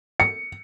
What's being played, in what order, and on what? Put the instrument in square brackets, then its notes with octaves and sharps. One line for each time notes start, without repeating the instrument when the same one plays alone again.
[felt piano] C#7